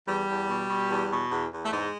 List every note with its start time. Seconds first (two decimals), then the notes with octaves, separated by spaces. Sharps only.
0.07 E2 G3
0.28 E2
0.49 B2
0.69 B2
0.90 E2
1.11 B2
1.31 E2
1.51 E2
1.64 A3
1.72 G#2 G#3